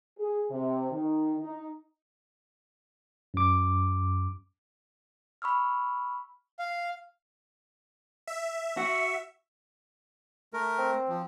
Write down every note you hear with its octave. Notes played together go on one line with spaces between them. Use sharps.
G#4
C3
D#3
D#4
F#2 D6
B5 C#6 E6 F6
F5
E5
F#4
A3 A#4
C4
F3